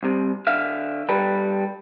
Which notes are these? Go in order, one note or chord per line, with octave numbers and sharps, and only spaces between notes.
C2 C3
D3 E5 F5
G3 A4 B4